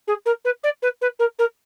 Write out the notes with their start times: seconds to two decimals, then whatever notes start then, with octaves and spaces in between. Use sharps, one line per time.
0.07 G#4
0.25 A#4
0.44 B4
0.63 D5
0.82 B4
1.01 B4
1.19 A#4
1.38 A#4